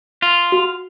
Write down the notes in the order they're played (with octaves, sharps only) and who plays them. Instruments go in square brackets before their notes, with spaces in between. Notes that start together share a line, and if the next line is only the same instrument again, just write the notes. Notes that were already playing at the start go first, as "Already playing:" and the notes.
[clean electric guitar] F4
[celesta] F#4